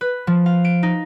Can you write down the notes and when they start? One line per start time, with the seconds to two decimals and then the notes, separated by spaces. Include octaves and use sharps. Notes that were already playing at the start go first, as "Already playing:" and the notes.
0.01 B4
0.27 F3
0.46 F5
0.65 D7
0.83 D#4